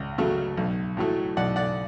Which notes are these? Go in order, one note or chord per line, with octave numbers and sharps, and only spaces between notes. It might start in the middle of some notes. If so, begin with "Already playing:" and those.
Already playing: C#2
C#3 F#3 A3
B1
A2 F#3 A3
B1 D5 F#5
D5 F#5